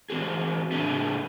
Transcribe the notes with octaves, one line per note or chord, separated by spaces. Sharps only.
E3 C4 F#4 G#4
A2 C#3 A3 D4 G#4 E5